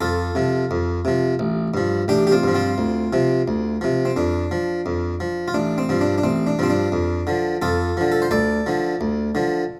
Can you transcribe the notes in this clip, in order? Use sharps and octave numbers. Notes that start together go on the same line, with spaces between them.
F2 F4 A4
C3 F3
F2
C3 F3
A1
G2 F3
A1 D4 G4
G4
C4 F4
G2 F3
C4 F4
D2
C3 F3
D2
C3 F3
C4
F2 D4
F3
F2
F3
F4
A1 D4
C4
G2 F3
D4
D4
A1 C4
D4
G2 F3 C4
D4
F2
D3 F3
F2 F4 A4
D3 F3
A4
C5
D2 A4 D5
D3 F3
D2
D3 F3